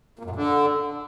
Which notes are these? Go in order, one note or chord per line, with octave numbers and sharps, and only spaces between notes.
A#2
F#2
A#2
D3